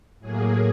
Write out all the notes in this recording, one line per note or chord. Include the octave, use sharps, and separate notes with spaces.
A2 F#3 A#3 G#4